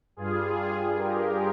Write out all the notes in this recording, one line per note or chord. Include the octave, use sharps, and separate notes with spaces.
G2 G3 F4 G#4
G4 A#4